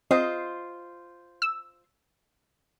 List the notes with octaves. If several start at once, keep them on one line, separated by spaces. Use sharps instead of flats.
C4 F4 C5 D#5
E6